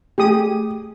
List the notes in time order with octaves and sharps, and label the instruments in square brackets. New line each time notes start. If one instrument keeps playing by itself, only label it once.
[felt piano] A3 [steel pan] G4 G#4 D#6